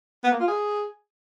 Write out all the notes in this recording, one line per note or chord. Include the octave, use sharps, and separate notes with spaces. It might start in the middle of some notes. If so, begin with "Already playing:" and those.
B3
A#3
F4
G#4